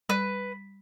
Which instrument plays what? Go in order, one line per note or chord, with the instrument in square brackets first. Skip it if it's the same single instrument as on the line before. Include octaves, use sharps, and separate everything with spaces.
[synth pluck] G3 [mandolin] B4